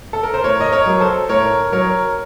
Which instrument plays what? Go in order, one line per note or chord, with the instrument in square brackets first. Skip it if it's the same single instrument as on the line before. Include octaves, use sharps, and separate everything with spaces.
[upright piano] A4
A#4
C5
A2 A#4 C#5
D#5
A#4 C#5
F#3
A4 C5
A2 A#4 C#5
F#3 A#4 C#5